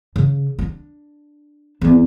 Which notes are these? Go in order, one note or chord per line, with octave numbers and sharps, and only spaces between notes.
C#3
D4
E2 C4